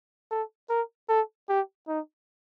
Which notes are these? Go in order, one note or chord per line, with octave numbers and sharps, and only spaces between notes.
A4
A#4
A4
G4
D#4